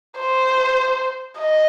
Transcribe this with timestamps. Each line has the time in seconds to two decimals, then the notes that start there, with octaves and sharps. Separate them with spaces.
0.19 C5
1.39 D#5